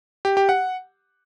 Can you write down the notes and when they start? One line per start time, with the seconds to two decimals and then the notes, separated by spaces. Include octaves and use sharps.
0.25 G4
0.37 G4
0.49 F#5